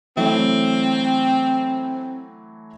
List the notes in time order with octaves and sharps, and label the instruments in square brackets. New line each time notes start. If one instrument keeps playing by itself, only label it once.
[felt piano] E3 F#3 A3 [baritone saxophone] C4